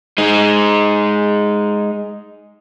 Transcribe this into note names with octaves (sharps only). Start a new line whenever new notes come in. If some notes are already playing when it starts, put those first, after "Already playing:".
G#3 D#4